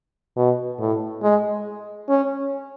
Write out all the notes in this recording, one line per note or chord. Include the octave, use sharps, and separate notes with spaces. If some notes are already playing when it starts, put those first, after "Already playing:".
B2
A2
G#3
C#4